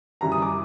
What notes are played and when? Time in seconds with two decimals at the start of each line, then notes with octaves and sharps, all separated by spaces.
0.21 F#2 C#3 E3 G3 A#5
0.32 D#6
0.42 D6